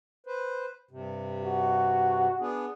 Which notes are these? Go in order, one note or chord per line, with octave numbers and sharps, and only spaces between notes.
B4 C5
G2 C3
F#4
B3 D4 G#4